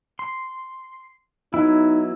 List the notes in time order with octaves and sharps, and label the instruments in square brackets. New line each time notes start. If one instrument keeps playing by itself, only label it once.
[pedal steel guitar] C6
[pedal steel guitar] F#3 B3 E4 [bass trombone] D#4